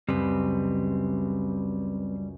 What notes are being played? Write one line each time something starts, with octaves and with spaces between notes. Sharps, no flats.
C#2 F#2 G3 C4 B4